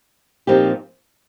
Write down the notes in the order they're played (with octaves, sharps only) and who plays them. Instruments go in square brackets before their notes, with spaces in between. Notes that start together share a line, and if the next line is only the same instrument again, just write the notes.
[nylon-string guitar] A#2 F3 C4 D#4 G4